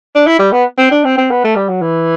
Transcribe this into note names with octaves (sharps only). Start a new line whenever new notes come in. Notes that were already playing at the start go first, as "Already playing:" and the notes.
D4
E4
G3
B3
C4
D4
C4
C4
B3
A3
G3
F#3
E3